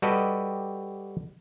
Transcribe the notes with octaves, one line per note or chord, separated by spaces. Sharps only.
G3 F#4 G4 A4 B4 D#5